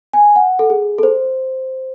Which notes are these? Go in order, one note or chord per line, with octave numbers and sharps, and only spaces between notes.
G#5
F#5
A4
G#4
A4
C5